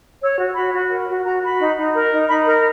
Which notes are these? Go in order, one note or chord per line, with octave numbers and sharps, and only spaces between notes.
C#5 E6
F#4
F#4 B5
F#4
A#4
F#4
F#4 A#5
F#4 B5
D#4
D#4
A#4
D#4
D#4 B5
A#4 A#5